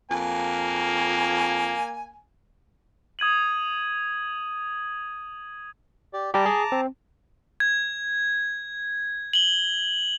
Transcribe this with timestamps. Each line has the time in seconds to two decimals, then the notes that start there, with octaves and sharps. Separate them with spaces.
0.11 F2 A#3 G#5
3.19 D#6 G#6 D#7 F#7
6.13 G4 D5
6.34 G3 G4 A5 A#5 D6
6.46 G#4
6.72 C4
7.60 G#6
9.33 F#7 G7